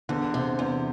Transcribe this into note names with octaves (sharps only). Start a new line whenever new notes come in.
E2 D3
C3
E2